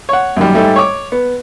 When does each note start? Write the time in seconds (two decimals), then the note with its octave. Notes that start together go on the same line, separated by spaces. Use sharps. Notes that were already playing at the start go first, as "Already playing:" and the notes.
0.09 C#5 F#5
0.37 F#2 D#3 G3
0.55 G#2 G3 A3
0.76 C#5 D6
1.12 B3